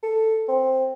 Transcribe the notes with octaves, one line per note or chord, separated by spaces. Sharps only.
A4
C4